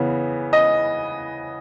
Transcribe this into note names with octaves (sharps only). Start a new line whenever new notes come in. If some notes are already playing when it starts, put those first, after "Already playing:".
Already playing: C#3 E3 B3
D#5